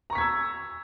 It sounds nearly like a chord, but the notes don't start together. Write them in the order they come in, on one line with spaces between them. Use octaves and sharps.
A#5 C#6 B6 G#6 E6